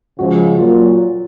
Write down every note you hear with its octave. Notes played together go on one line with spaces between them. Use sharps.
C#3 F3 G#3 F#4
A#2 F#3 A#3 F4